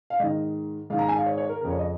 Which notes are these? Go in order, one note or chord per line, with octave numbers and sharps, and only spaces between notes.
F5
G#2 D#3 D#5
G#2 D#3 F5
A#5
G#5
F5
C#5
C#5
A#4
F2 C#3 A#4
C#5
D#5